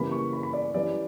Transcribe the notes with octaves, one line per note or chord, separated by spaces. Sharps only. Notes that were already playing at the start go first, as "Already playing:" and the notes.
Already playing: C#3 E3 G3 A#3 B5
C#6
B5
B5
D5
E3 G3 C#4 E4 D5